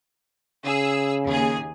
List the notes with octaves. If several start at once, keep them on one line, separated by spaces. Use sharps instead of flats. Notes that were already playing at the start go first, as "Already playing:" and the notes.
C#3 G#4 E6
D#2 G#4